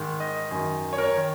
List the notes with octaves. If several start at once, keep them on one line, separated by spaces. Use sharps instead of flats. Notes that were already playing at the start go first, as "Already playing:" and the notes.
Already playing: G#2 D#3
D#5
F#2 D#3
C#5
A#4
C#5
D#3